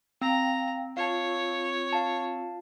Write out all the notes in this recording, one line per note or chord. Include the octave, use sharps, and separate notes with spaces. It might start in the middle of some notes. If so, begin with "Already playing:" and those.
C4 F5 G5 A#5
F4 C#5 F5 A5
F5 A5